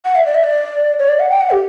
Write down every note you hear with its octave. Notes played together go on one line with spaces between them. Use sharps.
F#5
E5
D5
E5
D5
C#5
D5
F#5
G5
F#5
G4